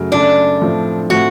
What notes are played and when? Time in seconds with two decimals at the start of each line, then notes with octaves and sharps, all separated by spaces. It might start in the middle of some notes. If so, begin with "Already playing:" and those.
Already playing: F#2 C#3 F#3 A3
0.12 F#2 C#3 F#3 A3 D4
0.61 A2 F3 A3 C4
1.10 A2 F3 A3 C4 F#4